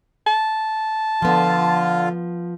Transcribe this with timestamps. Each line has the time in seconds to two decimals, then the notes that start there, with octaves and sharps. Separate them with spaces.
0.27 A5
1.22 D3 F3 B3 F4